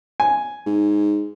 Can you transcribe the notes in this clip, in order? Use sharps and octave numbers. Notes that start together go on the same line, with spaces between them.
G#5
G#2